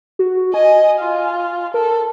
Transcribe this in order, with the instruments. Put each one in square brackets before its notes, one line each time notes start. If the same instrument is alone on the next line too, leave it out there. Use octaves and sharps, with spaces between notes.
[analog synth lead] F#4
[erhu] D#5 [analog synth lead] G#5
[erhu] F4
[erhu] A4 [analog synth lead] A#4